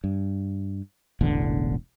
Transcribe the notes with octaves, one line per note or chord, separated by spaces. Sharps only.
G2
E1 A1 E2 D3